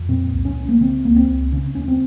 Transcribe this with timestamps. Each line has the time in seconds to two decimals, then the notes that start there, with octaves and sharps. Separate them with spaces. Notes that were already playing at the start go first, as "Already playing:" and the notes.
Already playing: F2
0.09 A#2 C4
0.32 C2
0.45 C#4
0.57 C2
0.69 A#3
0.80 C#3 C4
1.04 C#2 A#3
1.16 C4
1.29 C#2
1.52 C#3 C#4
1.75 D#2 C#4
1.88 C4